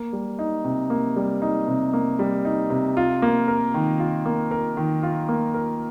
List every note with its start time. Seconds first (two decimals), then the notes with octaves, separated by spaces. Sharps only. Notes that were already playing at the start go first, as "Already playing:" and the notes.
Already playing: A#3
0.13 G3
0.39 D#4
0.65 C3
0.90 A#3
1.16 G3
1.42 D#4
1.68 C3
1.93 A#3
2.19 G3
2.45 D#4
2.70 C3
2.97 F4
3.22 A#3
3.48 A#4
3.74 D#3
3.99 F4
4.26 A#3
4.51 A#4
4.77 D#3
5.03 F4
5.29 A#3
5.54 A#4